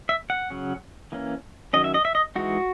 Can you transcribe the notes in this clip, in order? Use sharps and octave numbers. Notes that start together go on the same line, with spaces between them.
E5
F#5
C#3 F#3 C#4
E3 A#3 C#4
D#3 F#3 C#4 D#5
E5
D#5
E5
D#5
E3 G#3 D#4 F#4